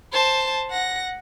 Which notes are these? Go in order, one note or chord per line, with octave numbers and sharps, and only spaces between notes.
C5 A5
F#5 A#6